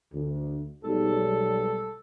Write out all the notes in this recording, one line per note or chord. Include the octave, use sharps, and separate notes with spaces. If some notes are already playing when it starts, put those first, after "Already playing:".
D2
B1 G#2 G3 A4